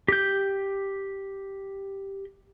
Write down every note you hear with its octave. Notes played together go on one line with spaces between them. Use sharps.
G4 G6